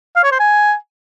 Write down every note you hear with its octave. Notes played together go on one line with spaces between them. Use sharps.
F5
C#5
C5
G#5